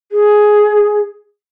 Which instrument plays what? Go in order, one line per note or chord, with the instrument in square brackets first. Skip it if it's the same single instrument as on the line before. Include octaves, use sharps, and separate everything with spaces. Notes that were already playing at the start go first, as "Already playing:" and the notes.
[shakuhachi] G#4